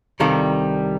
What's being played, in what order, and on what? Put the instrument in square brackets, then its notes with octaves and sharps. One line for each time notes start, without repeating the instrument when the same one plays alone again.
[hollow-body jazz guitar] C2 C3 D#3 G3 A4 F5